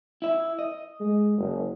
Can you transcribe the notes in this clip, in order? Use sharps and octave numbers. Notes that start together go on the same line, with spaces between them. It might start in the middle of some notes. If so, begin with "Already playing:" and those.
E4 E5
D#5
G#3
F#1